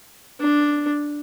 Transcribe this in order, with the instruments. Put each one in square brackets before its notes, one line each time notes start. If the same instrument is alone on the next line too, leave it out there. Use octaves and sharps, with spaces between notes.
[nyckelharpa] D4